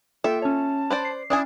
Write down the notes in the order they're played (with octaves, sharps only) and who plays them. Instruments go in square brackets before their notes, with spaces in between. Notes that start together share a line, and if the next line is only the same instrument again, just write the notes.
[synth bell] A#3 F4 A4 [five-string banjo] E5 [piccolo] G5
[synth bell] C#4 C#5 [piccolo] A5
[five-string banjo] B4 C5 D5
[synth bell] C7
[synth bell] C#4 [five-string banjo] D4 E4 G#5 [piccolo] D#6